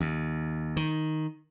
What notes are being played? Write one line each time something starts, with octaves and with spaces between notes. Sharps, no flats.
D#2
D#3